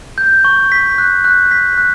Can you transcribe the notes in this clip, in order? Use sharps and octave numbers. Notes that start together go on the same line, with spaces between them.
G6
C#6
B6
F#6
F#6
B6
F#6